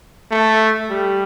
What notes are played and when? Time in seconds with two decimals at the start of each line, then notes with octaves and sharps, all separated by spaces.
0.31 A3
0.90 G3